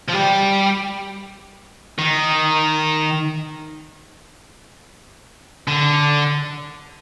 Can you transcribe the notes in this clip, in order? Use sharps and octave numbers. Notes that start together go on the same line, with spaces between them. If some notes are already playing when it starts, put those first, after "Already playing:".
F3
G3
D#3
D3